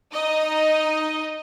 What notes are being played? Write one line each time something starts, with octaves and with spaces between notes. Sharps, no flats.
D#4 D#5